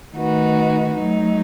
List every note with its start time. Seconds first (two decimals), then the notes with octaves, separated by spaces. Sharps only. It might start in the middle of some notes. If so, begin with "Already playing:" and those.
0.14 D#3 A3 D#4 F#4 B4
0.94 F#3 A3 D#4